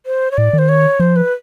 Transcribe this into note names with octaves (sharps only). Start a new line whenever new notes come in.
C5
C#5
A2 D5
D#3
C5
C#5
F3 C5
B4